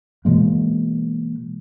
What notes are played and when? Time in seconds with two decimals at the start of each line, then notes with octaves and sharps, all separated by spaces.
0.25 B2 E3 G#3 A#3